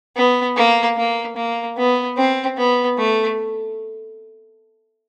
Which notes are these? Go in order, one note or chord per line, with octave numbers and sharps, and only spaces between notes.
B3
A#3
A#3
A#3
B3
C4
B3
A3